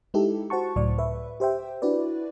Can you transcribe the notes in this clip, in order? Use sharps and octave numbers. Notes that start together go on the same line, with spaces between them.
G#3 D#4 E4 G4 A4
F#4 C5 F#5 A5 C#6
C#2 A2 F#3 D5 C#6
B4 E5
G4 C5 E5 G5
D4 E4 F#4 B4 D5